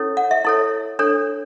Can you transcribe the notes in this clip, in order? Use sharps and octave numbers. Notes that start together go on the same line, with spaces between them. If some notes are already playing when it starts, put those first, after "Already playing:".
Already playing: C#4 E4 A4 C#5
F#5
E5
E4 A4 C#5
D4 A4 C#5